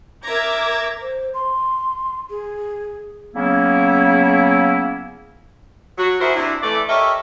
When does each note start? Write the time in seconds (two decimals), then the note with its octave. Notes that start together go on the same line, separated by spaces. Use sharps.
0.23 A#4 E5 A#5 D6 G#6
1.02 C5
1.34 C6
2.30 G#4
3.35 C#3 F#3 A#3 B3 C#4 E4
5.98 F#3 F#4
6.21 E4 F#4 G#4 A#4 C5 E5
6.36 C3 D4 E4
6.63 E3 A3 D5
6.88 G4 A4 A#4 C#5 D#5 E5